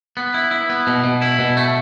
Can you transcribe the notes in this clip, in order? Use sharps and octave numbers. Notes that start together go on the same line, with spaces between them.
B3
E4
E4
B3
B2
B2
E4
B2
A3